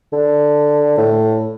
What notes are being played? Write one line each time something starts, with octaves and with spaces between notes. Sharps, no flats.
D3
A2